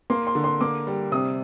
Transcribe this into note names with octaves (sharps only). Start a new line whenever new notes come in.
A#3 C6
C6
D3
C6
A#3 D6
G3
C3 D#6